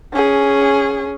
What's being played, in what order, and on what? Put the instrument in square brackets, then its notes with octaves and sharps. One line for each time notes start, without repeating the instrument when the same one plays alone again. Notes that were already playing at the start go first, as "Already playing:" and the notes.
[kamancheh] C#4 G#4